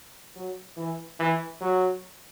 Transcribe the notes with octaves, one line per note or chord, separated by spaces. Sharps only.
F#3
E3
E3
F#3